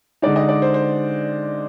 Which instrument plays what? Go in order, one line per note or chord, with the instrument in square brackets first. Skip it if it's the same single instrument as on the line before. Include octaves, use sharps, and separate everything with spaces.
[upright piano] D3 G#3 D#4 D5
D#5
D5
C5
C5